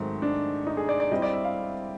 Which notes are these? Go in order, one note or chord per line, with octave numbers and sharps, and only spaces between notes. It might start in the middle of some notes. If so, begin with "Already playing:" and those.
Already playing: G#2 D#3 F#3 A3 C4
D4
D#4
G#4
D5
D5
G3 C4 E4 D#5
D5
E5
F5